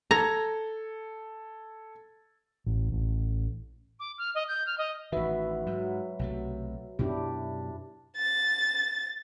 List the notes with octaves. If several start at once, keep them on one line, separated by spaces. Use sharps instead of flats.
A4 A#5 G#6
A1
A1
D6
F6
D#5
G6
F6
D#5
A1 D#3 F#4 B4 E5
G#2 F#3
B1 C3 A3
F#2 B2 D4 E4 G4
A6